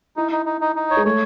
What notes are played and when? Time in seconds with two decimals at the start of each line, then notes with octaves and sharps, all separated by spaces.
0.16 D#4 E4
0.32 D#4
0.46 D#4
0.61 D#4
0.76 D#4
0.91 C#5
0.97 G#3
1.05 A3 C#5